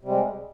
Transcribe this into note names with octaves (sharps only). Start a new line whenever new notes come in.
C3 G3 G#3